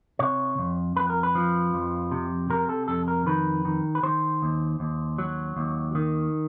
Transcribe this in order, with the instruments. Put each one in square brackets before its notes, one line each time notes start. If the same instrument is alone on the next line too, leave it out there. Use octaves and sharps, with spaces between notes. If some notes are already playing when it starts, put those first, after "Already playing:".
[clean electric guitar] C3 C#5
F2
F2 B4
A#4
B4
F3
F2
C3
C3 A#4
A4
F2 A4
A#4
D#3 B4
D#3
B4
D#3 C5
D#2
D#2
F#3
D#2
D#3